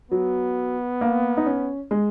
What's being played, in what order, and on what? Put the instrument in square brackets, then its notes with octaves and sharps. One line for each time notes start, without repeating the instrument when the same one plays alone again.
[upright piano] F#3 [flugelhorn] B3
[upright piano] A#3
D#4
C#4
G#3